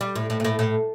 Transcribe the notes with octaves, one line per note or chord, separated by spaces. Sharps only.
G3
A2
A2
A#2
A2
A2